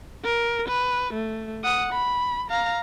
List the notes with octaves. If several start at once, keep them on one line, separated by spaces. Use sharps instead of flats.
A#4
B4
A3
F#5 D#6
B5
F5 A#5